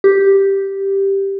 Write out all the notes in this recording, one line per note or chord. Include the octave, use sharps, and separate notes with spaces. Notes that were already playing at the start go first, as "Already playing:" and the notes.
G4